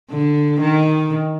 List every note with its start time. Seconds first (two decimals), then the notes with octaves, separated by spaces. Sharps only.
0.10 D3
0.61 D#3